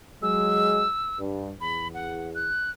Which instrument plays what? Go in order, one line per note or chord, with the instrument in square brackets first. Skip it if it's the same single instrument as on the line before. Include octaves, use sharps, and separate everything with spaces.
[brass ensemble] F#3 G#3 [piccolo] E6
[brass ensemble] G2
[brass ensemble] E2 [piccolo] B5
[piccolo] F#5
F#6